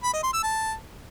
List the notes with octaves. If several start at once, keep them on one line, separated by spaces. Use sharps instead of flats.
B5
D#5
C6
E6
A5